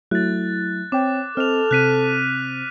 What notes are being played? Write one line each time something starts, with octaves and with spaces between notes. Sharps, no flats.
F#3 A3 E4 F#6 A6
C4 C#5 G5 D6
C4 A4 D#5 F6 F7
C3 C4 F#6 B6 D#7